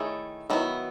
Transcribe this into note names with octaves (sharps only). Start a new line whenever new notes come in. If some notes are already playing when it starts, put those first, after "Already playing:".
Already playing: D#3 A3 E4 G#4 C#5
D#3 F#3 B3 E4